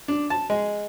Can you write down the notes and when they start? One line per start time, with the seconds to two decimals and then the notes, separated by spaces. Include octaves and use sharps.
0.08 D4
0.30 A5
0.50 G#3